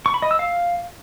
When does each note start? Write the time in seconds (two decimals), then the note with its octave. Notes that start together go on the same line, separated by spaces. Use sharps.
0.06 C#6
0.14 B5
0.22 D#5
0.31 E6
0.39 F5